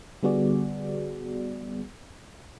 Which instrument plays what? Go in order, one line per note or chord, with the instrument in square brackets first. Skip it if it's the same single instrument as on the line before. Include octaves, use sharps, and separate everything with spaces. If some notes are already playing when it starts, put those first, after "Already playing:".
[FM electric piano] D3 G3 B3 F#4 G#4 D5